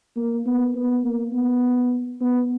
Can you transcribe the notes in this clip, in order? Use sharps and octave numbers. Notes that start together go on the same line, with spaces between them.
A#3
B3
B3
A#3
B3
B3